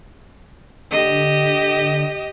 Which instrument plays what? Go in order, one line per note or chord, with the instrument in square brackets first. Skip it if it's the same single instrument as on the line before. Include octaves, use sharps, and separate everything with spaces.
[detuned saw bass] D3 [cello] G4 D#5